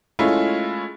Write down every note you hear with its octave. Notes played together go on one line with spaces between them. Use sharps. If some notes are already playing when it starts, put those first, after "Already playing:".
G#3 A3 C#4 E4 F4